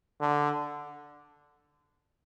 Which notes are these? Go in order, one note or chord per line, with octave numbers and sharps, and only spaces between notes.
D3